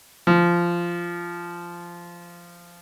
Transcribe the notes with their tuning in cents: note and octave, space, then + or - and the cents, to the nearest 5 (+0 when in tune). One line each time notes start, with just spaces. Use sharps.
F3 -15